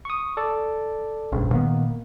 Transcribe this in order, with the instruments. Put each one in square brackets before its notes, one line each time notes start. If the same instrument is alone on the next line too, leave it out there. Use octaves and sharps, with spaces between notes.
[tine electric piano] C#6 D#6
A4 D5
[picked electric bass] F1 A#1 [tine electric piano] G2 C#3
[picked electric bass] A#2 D#3 B3 [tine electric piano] A#3